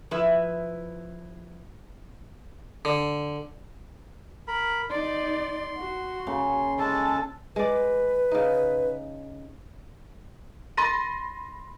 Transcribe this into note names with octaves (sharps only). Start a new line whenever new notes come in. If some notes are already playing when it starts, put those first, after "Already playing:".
F3 E4 B4 E5
D3
A#4 B5
D#4 D5 C6
F#4
C#3 A#3
G#3 A4 A5
G#3 B4 D5
C#3 D#4
B5 C6 A6 A#6 D#7